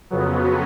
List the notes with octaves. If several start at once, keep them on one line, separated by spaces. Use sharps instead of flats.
F2 C#3 F#3 B3